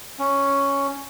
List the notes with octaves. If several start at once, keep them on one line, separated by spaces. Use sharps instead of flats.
C#4